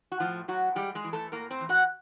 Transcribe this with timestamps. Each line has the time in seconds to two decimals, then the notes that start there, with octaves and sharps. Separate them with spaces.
0.12 F#4
0.20 A2 F3 F4
0.48 A2 F#3 F#4
0.75 G3 G#3 G4
0.95 G#3 G#4
1.04 E3
1.13 A3 A4
1.32 A2 A#3 A#4
1.50 C4 C5
1.61 E3
1.69 F#4 F#5